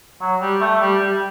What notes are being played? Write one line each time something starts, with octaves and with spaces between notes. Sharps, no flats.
F#3
G3
A3
G3
G3